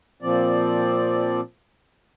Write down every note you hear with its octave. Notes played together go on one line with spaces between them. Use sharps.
A#2 F3 C4 D5